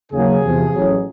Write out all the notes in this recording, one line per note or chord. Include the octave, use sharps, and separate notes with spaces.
D#2 C#3 F#3 G#4
E2 C3 F3
A1 A2 F#3